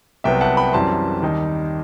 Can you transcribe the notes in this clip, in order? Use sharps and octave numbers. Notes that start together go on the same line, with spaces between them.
C2 C3 F#3 B3 E5 G5
F#5 A5
G5 B5
F#2 E3 G3 C4 A5 C6
D#2 D#3 G3 D#4